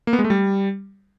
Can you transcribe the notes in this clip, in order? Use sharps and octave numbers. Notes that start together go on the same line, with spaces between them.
A#3
B3
G#3
A3
G3